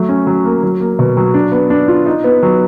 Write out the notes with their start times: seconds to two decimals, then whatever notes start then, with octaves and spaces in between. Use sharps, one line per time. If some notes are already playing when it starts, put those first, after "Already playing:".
Already playing: F#3 A3
0.09 C#4
0.27 F#3
0.45 A#3
0.63 F#3
0.80 A#3
0.99 B2
1.17 F#3
1.34 D4
1.52 B3
1.70 D4
1.88 F4
2.06 D#4
2.24 B3
2.43 F#3